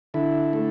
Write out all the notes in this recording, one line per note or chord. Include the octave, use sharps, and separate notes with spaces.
D3 E4
A3